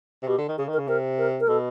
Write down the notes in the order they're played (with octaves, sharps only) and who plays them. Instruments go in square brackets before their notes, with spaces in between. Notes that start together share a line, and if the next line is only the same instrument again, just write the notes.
[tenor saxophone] C3
[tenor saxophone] B2 [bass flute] G4
[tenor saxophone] D3
D#3
[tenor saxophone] C#3 [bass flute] G#4
[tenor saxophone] D#3
[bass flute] A#4
[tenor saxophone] C#3
[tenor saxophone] C3 [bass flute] A#4
[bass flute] A#4
A#4
[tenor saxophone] B2 [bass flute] A4